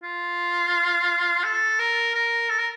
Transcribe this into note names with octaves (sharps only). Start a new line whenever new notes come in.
F4
A4
A#4
A#4
A4
A#4